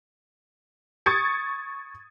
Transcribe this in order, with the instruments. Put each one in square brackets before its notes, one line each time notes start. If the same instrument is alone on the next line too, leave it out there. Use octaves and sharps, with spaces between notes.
[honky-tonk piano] C#6 D#6 G#6 A6 C#7